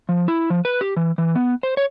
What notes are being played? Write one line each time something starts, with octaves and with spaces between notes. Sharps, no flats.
F3
E4
F3
B4
G4
E3
E3
B3
C5
C#5